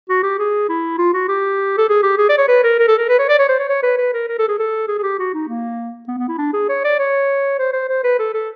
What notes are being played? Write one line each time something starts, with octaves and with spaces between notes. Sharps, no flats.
F#4
G4
G#4
E4
F4
F#4
G4
A4
G#4
G4
G#4
D5
C#5
B4
A#4
A#4
A4
A#4
B4
C#5
D5
C#5
C5
C#5
C#5
B4
B4
A#4
A#4
A4
G#4
A4
G#4
G#4
G4
F#4
D#4
A#3
B3
B3
E4
D4
G#4
C#5
D5
C#5
C5
C5
C5
B4
A4
A4